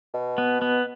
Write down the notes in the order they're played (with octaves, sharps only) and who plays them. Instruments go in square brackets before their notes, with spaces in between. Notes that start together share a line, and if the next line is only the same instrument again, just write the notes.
[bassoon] B2
[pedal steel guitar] B3
B3